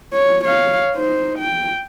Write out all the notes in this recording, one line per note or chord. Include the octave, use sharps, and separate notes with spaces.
C#5
C#5 F5
D#4 C5
G5